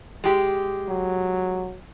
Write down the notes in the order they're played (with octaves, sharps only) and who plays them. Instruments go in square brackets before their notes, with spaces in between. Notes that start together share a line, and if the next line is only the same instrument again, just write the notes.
[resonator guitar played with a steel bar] G#3 G4
[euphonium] F#3